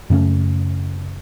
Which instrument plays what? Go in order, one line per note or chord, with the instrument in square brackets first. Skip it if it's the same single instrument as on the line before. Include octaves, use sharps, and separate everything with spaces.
[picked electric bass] F#2 C#3 A3 C#4